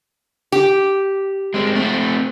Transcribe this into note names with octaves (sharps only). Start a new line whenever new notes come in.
G4
G#3 C4
A3 C4